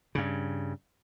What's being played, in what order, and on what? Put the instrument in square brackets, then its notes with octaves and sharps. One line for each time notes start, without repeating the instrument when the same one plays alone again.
[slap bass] G2 C#3